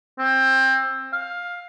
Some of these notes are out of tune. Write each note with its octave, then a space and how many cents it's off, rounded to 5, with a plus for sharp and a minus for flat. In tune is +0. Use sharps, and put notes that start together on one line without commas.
C4 +20
F5 +15